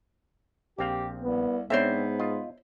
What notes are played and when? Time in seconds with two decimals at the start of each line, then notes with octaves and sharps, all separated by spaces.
0.79 A#1 C4 G4 F5
1.22 C2 B3
1.70 G#2 B3 C4 D4 C5 C#5 E5
2.19 F4 D#5